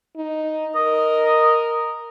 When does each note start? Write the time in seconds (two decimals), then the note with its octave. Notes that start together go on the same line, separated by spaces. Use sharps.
0.16 D#4
0.75 A#4 D#5